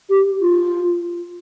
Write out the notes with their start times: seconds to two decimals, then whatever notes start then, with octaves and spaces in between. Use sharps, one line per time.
0.10 G4
0.41 F4